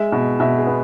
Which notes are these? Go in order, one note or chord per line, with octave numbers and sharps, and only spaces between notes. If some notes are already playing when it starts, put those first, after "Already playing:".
Already playing: G#3 E5
B2
B2 E5
G#4
B3